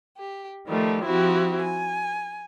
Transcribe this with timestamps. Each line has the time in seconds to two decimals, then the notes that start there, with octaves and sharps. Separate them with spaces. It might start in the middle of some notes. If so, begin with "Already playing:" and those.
0.18 G4
0.67 D#3 F3 G3 A3
1.03 F3 C4 E4 F#4 G4
1.61 G#5